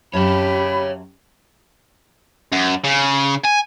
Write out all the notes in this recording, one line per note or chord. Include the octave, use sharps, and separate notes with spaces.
F#2 G4 C#5 F5 A5 B5
F#2
C#3
G#5